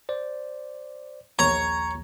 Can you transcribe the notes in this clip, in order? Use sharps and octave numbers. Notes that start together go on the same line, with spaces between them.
C5 D5
A#1 D#2 C#5 A#5